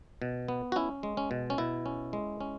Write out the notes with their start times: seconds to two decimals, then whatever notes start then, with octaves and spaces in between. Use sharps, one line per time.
0.22 B2
0.48 B3
0.72 F#4
0.76 C#4 E4
1.03 G#3
1.17 C#4
1.31 B2
1.50 C#4
1.58 B2 E4
1.86 C#4
2.13 G#3
2.41 C#4